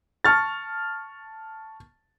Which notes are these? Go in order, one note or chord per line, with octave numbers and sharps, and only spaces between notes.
A5 C#6 F6 A6